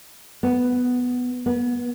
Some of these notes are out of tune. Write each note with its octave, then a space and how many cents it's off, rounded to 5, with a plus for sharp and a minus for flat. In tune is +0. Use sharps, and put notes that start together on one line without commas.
B3 +5
B3 -25